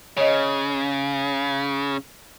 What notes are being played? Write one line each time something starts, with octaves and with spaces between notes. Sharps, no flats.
C#3 C#5 D#5